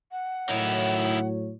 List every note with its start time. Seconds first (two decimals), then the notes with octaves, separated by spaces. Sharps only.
0.12 F#5
0.49 A2 D#3 F#3 E4 C#5